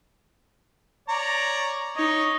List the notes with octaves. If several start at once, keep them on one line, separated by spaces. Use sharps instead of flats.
C#5 D5 A#5
D#4 C#5